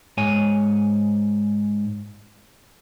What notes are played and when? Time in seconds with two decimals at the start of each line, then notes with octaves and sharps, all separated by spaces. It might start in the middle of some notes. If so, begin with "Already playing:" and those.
0.17 G#2 C#5 G#5